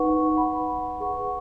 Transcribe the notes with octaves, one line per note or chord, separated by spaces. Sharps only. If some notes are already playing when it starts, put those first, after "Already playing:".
Already playing: D#4 B4 F#5 C#6
B4 F#5 B5
G#4 B4 F#5 C#6